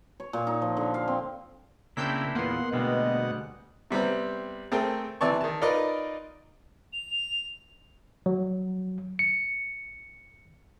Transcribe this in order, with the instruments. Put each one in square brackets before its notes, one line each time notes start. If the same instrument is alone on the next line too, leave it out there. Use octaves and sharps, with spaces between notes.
[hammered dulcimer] C#5
A#2
D#4
F3
D3
F5
C4
[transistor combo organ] C#3 A#3 [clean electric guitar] C4 D4 E4 [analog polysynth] E6 G6 B6
[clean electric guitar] E2 A#2 [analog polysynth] A#3 B3 [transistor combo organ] F#5 C6
[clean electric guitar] D2 G3 G#3 [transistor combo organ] B2 F#5 [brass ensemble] D#5
[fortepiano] C3 G3 B3 C4
A3 C4 G#4 A#4 G5
C3 E3 D5 A5 C#6
D#3 A5
D#4 F4 A#4 B4 D5 D#5
[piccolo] F7
[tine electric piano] F#3
C#7